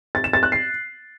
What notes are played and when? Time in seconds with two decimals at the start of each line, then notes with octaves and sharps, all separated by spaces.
0.15 A6
0.24 E7
0.33 A6
0.43 F#6
0.52 C7